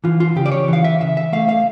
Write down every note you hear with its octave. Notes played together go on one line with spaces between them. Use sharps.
E3 F4
F4
C#3 G4
D5
C#5
E3 F5
E5
C#3 E5
E5
A3 F5
F5